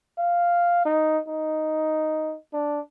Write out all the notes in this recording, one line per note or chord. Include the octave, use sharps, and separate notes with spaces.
F5
D#4
D#4
D4